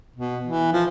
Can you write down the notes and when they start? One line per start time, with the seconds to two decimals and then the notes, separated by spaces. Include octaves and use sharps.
0.16 B2
0.45 E3
0.73 F3